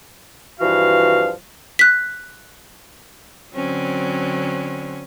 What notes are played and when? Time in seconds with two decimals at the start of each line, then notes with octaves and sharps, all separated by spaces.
0.60 G2 E3 F3 F#4 F5
1.79 F#6 B6
3.53 D3 F#3 C4 C#4